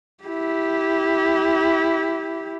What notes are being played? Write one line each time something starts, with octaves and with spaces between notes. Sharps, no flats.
E4 G4